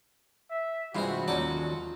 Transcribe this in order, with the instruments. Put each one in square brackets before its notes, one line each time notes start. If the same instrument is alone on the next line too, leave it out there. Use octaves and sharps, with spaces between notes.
[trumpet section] E5
[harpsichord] G2 C3 G#4 [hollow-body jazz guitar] E3 G#3 F4 [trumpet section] F#4 [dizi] B5
[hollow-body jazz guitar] D#2 C#4 D5 [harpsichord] F#3 D#4 A4 [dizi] F4